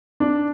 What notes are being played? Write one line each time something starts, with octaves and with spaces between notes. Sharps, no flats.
D4